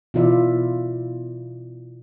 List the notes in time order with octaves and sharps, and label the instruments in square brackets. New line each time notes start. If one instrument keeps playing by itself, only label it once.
[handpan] B2 E3 E4 F4 D5 E5